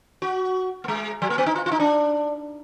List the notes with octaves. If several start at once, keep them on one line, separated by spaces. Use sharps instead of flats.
F#4
A#3
G#3
F#3
A#3
B3
D#4
F4
F4
D#4
D4